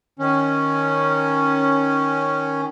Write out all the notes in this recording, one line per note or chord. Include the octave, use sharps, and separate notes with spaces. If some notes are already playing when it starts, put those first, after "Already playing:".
D#3 C#4